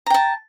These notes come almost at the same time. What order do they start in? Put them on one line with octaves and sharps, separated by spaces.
A#5 G5 A5